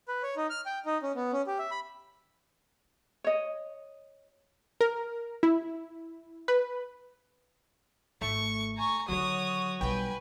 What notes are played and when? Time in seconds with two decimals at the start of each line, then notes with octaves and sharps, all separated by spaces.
0.08 B4
0.23 C#5
0.36 D#4
0.50 F6
0.66 G5
0.86 D#4
1.02 C#4
1.15 B3
1.32 C#4
1.47 G4
1.59 E5
1.71 B5
3.24 C#5 D#5
4.81 A#4
5.43 E4
6.48 B4
8.21 G#1 A3 C#6
8.77 G#5 A#5 C#6
9.08 D3 D#3 F#3 F#4 C#5 D#6
9.81 B1 G3 B4 G5 G#5